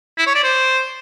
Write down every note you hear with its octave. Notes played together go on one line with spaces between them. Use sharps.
E4
C#5
D5
C5